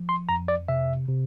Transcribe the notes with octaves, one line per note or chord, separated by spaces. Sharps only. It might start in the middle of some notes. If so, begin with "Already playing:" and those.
Already playing: F3
C6
F2 A#5
D5
C3 E5
C3